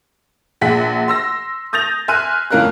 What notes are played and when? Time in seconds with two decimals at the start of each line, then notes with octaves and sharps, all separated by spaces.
0.61 A#1 G#4 F#5 B6
1.08 C6 E6 A#6
1.73 D#6 G6 A6 A#6 F7
2.08 E5 G#5 C6 F6 F#6 D#7
2.51 F2 A2 C#4 A#4 F5 F#6